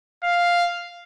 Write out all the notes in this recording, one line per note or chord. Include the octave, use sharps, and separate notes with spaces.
F5